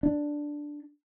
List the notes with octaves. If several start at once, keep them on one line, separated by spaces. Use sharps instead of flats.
D4